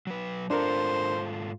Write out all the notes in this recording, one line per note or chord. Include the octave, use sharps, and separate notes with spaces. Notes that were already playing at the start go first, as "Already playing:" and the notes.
F#3 B4
G#2 D4 F4 A4 A#4 C5